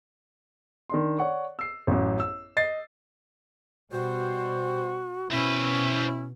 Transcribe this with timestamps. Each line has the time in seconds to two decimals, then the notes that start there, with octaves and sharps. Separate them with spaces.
0.90 D#3 D4 C6
1.19 C#5 D5 F#5 C#6
1.59 E6 C7
1.87 A1 F#2
2.20 E6
2.57 D#5 A6 C7
3.92 B2 G3 F#4 C5
5.31 B2 C4 C#4 E4 B4